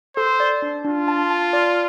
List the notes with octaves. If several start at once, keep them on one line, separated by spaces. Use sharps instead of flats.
A4 C5
D5
D4
D4 F4
A5
A5
D5